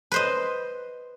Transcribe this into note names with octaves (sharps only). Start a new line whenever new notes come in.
B4 C5 D#5